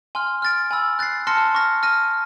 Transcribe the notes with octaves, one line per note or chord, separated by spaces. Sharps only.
G#5 C6 F6
F6 A6 D7
G#5 B5 E6
F#6 A6 C7
A5 C6 F6 A#6 C#7
C#6 F6 A#6
F6 A#6 D#7